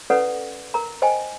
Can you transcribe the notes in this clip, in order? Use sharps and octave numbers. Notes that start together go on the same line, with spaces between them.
C#4 E4 A4 B4 D5 F#5
A#4 A#5
C5 D#5 G5 G#5